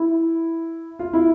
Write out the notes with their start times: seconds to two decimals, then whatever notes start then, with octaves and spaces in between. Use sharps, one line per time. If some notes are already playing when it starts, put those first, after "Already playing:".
Already playing: E4
0.99 F4
1.13 E4